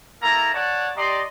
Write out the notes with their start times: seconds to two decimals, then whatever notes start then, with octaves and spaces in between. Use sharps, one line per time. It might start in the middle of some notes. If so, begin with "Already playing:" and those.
0.22 A#3 E4 A4 A#5
0.54 C#5 D5 F#5 A5
0.96 G4 D5 D#5 A#5 C6